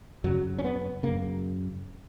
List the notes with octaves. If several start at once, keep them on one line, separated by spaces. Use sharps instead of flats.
F#2 C#3 F#3
C#4
B3
F#2 C#3 A#3